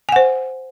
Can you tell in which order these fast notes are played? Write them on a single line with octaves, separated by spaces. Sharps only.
G#5 F#5 C5